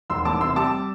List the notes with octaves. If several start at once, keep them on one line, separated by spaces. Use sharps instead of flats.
E1 C6 E6
E2 A5 D6
C3 C6 E6
G3 A5 D6